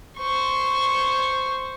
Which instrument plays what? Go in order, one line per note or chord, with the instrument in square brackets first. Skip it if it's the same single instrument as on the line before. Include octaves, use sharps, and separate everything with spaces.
[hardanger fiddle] C5 C#6